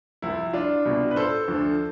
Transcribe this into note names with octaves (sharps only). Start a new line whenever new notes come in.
C2 C3 F3 E4
D4 F4
C2 B2
B4
A4 C5
D2 D3 F3